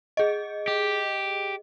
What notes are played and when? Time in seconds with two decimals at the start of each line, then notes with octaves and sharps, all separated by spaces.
0.17 G#4 D#5
0.68 G4